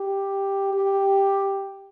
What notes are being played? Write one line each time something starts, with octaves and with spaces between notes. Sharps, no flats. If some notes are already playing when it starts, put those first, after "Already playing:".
Already playing: G4
G4